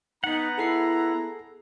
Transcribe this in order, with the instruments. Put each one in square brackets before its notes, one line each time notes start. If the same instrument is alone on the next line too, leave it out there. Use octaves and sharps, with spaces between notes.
[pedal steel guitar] B3 F#5 [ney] D#4 [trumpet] A#5
[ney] E4 [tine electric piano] G#4 A4 C7